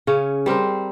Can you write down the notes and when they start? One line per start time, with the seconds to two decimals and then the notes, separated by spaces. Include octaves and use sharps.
0.07 C#3 C#4
0.46 G3 C4 A#4 C5